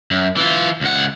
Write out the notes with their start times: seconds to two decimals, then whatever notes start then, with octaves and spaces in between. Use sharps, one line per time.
0.11 F#2
0.37 E3 F4
0.81 C#2 F#5